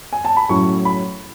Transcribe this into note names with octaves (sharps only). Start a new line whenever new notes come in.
G#5
A5
B5
A2 F#3 C#4 E4 C#6
B5